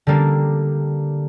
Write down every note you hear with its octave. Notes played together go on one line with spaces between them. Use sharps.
D3 G3 A#3 D4